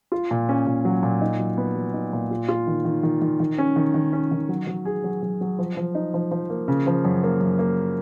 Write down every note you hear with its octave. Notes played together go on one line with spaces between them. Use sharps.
F4
A#2
C#4
A#2
F#3
A#2
D#4
F#3
B3
F#3
D#4
A#2
F4
F4
D#3
D#3
D#3
D#3
D#3
C#4
D#3
D#3
C#4
D#3
F#3
F#3
G#4
F#3
F#3
F#3
F3
F3
D#4
F3
F3
A#3
C#3
F3
F#2
A#3
F#2
A#3